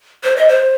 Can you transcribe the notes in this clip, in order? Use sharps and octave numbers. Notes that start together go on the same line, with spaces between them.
C5
D#5
C5